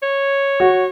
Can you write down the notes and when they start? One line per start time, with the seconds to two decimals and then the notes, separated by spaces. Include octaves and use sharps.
0.02 C#5
0.60 F#4